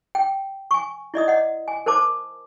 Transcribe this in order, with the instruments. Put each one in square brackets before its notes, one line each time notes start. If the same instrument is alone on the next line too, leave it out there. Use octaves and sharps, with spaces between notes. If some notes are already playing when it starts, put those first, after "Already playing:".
[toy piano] G5
G#5 C#6
E4 D5 D#5 D#6
D#5 F#5
G#5
A#4 C5 A5 D6